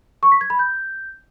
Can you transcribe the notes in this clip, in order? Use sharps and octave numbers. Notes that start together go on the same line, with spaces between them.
C#6
B6
G#6
B5
G6